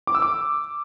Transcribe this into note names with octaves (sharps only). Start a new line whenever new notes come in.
D6
E6
D6